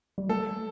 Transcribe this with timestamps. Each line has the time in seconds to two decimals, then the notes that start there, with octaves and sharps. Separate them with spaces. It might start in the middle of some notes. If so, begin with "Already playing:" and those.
0.18 G3
0.29 A3 A4